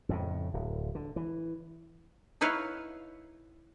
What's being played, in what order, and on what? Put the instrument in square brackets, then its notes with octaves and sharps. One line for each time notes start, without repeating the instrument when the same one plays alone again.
[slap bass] F2 A2 C#3
D1
D3
E3
[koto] D#4 E4 B4 C#5 F5